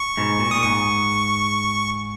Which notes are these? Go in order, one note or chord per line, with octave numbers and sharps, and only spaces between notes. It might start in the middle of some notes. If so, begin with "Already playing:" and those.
Already playing: C#6
G#2 B2
A#2
A#2 D#6
G#2 C#6